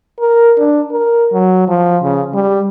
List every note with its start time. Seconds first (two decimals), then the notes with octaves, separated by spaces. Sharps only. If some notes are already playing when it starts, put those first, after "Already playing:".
0.19 A#4
0.58 D4
0.91 A#4
1.33 F#3
1.68 F3
2.03 C#3
2.34 G3